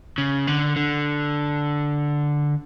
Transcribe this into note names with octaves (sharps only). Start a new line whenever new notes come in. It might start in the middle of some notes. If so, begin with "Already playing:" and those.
C#3
D3
D3